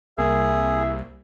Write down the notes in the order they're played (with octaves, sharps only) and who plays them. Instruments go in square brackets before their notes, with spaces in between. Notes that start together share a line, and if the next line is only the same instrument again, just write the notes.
[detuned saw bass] C2 [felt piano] A#3 [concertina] G#4 [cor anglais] E5